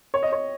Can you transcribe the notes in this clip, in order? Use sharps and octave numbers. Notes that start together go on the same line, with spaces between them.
C#5
D#5
C#5